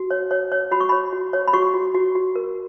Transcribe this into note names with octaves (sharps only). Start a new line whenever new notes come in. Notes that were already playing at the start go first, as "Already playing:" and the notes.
Already playing: F#4
C#5
C#5
C#5
F#4 B5
C#6
C#5 B5
F#4
C#5
B5
F#4 C#6
F#4
F#4
F#4
A#4